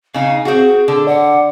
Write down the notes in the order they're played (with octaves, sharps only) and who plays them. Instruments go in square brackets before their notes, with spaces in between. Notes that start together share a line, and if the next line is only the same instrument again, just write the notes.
[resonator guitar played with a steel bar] C#3 D#4 [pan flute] F5
[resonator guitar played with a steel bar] C4 F#4 [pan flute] G#4
[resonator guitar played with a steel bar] D3
[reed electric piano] D5 [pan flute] F#5